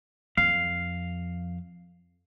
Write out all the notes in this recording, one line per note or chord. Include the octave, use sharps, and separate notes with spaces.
F2 F5